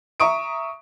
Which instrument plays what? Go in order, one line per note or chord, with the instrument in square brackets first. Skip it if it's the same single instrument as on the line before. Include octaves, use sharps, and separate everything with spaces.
[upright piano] E5 A#5 C#6 D#6 D7